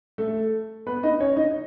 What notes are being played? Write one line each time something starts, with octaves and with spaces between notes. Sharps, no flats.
A3 A4
B3 B4
D#4 D#5
C#4 C#5
D#4 D#5